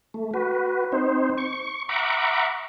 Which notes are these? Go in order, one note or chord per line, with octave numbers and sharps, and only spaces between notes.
A3
F#4 B4
C4 D#4 C5
C#6
E5 F#5 A#5 B5 C#6 D6